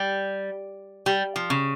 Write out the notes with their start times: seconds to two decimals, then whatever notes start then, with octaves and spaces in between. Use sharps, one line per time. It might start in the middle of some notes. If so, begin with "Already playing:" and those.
Already playing: G3
1.06 G3
1.36 F3
1.50 C#3